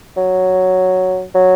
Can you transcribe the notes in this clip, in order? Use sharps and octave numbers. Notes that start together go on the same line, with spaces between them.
F#3
F#3